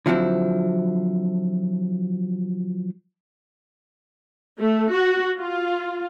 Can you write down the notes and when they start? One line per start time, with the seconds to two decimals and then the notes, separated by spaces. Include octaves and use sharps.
0.06 D3 F3 F#3 C4 E4
4.61 A3
4.92 F#4
5.38 F4